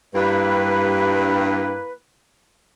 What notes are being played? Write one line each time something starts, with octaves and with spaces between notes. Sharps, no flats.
G2 A#3 E4 B4